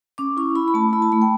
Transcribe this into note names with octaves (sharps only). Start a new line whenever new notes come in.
C#4 D6
E4 C#6
E4 B5
B5
A3 A5
E4 B5
A5
A3 B5
G5